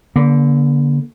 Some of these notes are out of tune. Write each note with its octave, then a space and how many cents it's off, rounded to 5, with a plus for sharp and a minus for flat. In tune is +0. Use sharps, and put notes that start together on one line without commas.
D3 -25 A#3 +35